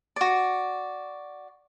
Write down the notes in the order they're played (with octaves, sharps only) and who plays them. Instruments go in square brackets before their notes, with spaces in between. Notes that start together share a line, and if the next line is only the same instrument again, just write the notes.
[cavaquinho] F#4 D5